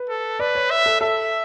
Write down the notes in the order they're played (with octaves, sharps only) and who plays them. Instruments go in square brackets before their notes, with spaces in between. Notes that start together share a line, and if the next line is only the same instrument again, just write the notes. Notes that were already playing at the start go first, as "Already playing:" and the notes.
Already playing: [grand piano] B4
[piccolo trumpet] A4
[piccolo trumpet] B4 [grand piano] D5
[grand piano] C#5
[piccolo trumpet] E5
[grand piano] A4
[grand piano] A4 [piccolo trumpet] E5